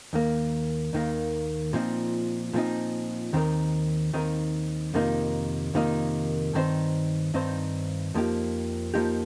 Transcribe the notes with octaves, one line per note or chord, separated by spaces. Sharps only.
D#2 D#3 A#3
D#2 D#3 A#3
A#2 F3 C4 D#4
A#2 F3 C4 D#4
D#2 D#3 C4 D#4 A#4
D#2 D#3 C4 D#4 A#4
F2 C3 D#3 A#3 D#4
F2 C3 D#3 A#3 D#4
G2 D#3 C4 D#4 C5
G2 D#3 C4 D#4 C5
F2 F3 A#3 D#4 G4
F2 F3 A#3 D#4 G4